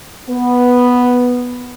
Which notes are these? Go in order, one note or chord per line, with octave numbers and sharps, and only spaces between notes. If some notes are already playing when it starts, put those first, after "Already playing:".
B3